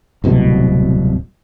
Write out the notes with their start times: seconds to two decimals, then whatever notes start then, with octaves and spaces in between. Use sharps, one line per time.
0.24 D1 C2 B2